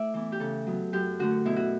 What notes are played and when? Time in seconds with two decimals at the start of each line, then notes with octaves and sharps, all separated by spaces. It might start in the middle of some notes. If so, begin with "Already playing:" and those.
Already playing: A3 E4 D5 E5
0.14 E3 B3
0.32 G4
0.40 C#3 A4
0.66 F#3 B3
0.93 F#2 G4
1.19 D3 A3 F#4
1.45 B2 E4
1.56 F#4